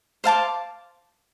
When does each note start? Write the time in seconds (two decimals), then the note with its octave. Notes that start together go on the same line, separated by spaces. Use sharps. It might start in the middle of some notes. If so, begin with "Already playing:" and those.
0.24 C5 F5 A5 D6